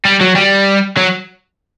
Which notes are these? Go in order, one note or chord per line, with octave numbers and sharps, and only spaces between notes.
G3
F#3
G3
F#3